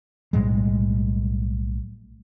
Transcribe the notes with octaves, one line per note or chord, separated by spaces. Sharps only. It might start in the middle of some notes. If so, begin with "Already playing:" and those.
B1 A2 G3 G#3